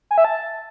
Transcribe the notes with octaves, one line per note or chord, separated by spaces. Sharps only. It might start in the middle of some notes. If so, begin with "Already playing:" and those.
G#5
E5
A5